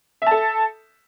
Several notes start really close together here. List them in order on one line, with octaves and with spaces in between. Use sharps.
E5 A5 A4